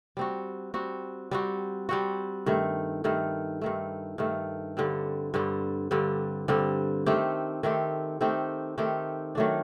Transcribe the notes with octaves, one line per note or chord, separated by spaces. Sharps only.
G3 C4 F#4
G3 C4 F#4
G3 C4 F#4
G3 C4 F#4
G2 D#3 A3
G2 D#3 A3
G2 D#3 A3
G2 D#3 A3
G2 D3 G3 C4
G2 D3 G3 C4
G2 D3 G3 C4
G2 D3 G3 C4
D#3 A3 C4 G4
D#3 A3 C4 G4
D#3 A3 C4 G4
D#3 A3 C4 G4
D#3 F#3 A3 D4